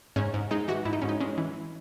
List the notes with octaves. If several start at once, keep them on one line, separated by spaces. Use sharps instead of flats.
G#2 C#4
G#2
G#3 D#4
E3 F#4
G#2 E4
D#4
G#2 C#4
D#4
G#3 C#4
E3